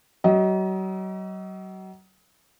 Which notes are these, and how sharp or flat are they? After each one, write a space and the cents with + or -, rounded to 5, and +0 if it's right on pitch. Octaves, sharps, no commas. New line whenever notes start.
F#3 +40 D#5 +25